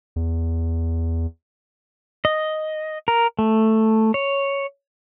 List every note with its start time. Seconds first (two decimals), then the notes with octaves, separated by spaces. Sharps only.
0.16 E2
2.25 D#5
3.08 A#4
3.39 A3
4.14 C#5